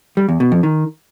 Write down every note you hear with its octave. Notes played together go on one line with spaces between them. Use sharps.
G3
E2
B2
F2
D#3